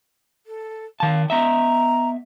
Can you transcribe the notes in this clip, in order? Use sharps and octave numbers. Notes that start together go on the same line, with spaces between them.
A4
D#3 F5 A5
B3 D#5 E5 A#5